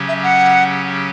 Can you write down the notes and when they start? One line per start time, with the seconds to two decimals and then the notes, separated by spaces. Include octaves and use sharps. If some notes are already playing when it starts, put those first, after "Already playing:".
Already playing: C#3 F#3 C#4 G4
0.08 E5
0.23 F#5